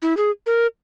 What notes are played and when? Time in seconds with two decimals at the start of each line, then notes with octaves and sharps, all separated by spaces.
0.02 E4
0.17 G#4
0.46 A#4